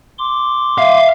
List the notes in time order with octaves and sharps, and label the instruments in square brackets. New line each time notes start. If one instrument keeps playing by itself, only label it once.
[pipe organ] C6 D6
[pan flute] E5 [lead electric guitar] F5